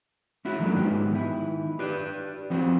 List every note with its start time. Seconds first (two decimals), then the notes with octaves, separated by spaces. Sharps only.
0.45 C#4 E4 F#4
0.59 D#3 F#3 A3 A#3 D4
0.76 G#2 B3 G4
1.11 D#3 E4
1.79 G4 B4 D5
2.50 F3 C4 F#4 C5